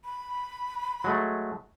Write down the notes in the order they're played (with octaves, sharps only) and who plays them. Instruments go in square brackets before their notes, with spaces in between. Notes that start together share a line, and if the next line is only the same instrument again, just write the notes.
[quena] B5
[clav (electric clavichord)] F#3 G#3 A3